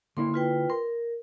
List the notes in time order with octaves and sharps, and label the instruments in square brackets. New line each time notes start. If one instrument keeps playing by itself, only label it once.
[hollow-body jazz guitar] D3 A#3 E4 [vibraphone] C6
[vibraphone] F4 B4 G5
[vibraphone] A#4 [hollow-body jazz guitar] C6